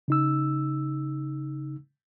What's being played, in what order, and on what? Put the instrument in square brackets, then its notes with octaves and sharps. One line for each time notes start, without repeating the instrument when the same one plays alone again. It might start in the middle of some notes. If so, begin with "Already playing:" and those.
[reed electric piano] C#3 D#4 E6